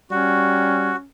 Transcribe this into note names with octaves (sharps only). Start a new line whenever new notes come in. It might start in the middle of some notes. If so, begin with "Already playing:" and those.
G3 C#4 F#4